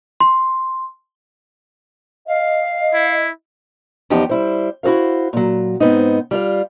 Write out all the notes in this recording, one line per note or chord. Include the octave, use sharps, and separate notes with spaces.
C6
D#5 F5
E4
E2 F3 D#4 G4 F#5
G3 E4 C5
E4 F#4 A4 C5 F5
A#2 F#3
G#2 B3 C4 D#4
G3 F4 F5